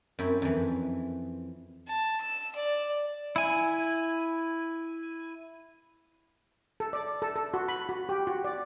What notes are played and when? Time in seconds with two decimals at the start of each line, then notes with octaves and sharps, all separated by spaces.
0.19 F#2 C4 E4
0.42 F2 E3
1.88 A5
2.21 E6
2.55 D5
3.36 E4 G#5
6.80 A4
6.93 D5
7.22 A4
7.36 A4
7.54 F#4
7.68 B5
7.89 F#4
8.09 G4
8.27 F#4
8.44 D5